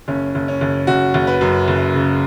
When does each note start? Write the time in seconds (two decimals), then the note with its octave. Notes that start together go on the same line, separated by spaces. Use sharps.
0.08 F#1 C#4
0.35 F#1
0.48 C#4
0.61 F#1
0.87 F#1 F#4
1.14 F#1
1.27 B4
1.41 F#2
1.68 F#1
1.94 C#3